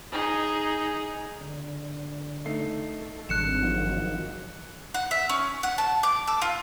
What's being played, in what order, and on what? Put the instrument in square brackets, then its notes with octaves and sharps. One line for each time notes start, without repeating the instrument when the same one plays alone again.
[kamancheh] D#4 G#4
[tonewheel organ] D3
[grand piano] A3 D#4 C7
[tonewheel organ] A4
[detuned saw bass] G#1 [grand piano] G2 [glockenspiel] F#6 C#7 E7
[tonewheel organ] D#3 F3 F#3
[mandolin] F#5
E5
C#4
F#5
A5
D6
A4
F4